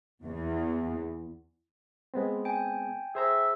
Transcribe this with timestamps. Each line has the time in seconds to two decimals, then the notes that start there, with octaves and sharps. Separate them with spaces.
0.23 E2
2.14 G#3 B3 C4
2.45 G5 G#5
3.15 G#4 C5 E5 A#5